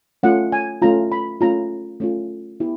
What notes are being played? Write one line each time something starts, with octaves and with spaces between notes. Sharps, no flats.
A3 C#4 F4 F#5
G#5
A3 C#4 F4 A#5
B5
A3 C#4 F4 A#5
A3 C#4 F4
B3 E4 G4